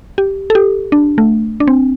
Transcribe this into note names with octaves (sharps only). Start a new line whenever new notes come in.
G4
A4
G4
D4
A3
D4
C4